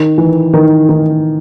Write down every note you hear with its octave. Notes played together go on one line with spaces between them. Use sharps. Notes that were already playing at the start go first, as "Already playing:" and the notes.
Already playing: D#3
E3
D#3
D#3